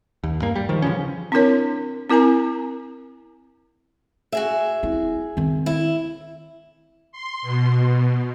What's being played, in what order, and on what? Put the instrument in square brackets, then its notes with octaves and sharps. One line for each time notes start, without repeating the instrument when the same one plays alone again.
[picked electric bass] D#2
G2 A#3
G3
D#3 F3
C#3 E3 F3 C#4
[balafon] C4 D4 E4 A#4 C#5
C4 E4 A#4 G#5 A#5
[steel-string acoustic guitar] F#4 G#4 E5
[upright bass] C4 E4
D#3 C4
[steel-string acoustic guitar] E4
[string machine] C6
B2